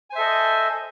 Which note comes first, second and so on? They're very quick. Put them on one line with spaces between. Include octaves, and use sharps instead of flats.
G#5 C5 E5 A4 D#5